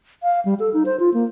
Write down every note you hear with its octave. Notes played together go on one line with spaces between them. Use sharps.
F5
G3
A4
D#4
C5
F4
A#3